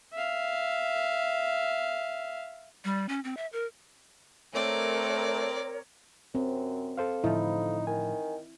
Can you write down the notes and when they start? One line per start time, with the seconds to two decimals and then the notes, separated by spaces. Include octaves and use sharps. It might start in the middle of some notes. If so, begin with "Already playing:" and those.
0.13 E5 F5
2.85 G3
3.09 C#4
3.24 C4
3.37 E5
3.53 A#4
4.53 A3 C4 A#4 C#5 D5
6.35 F#2 C4
6.97 A4 C5 F5
7.24 A2 D3 F3 D#4 E4
7.87 D#3 G#5